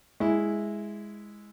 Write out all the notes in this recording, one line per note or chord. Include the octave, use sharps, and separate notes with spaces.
G#3 E4